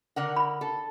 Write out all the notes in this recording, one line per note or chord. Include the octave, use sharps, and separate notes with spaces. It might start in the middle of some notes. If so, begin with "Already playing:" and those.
D3 A#4 F#5
B5
A4